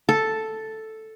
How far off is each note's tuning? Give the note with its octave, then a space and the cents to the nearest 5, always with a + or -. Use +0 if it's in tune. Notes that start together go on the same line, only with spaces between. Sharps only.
A4 +0 A5 +0